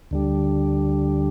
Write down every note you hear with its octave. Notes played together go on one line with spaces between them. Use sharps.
D2 D3 G3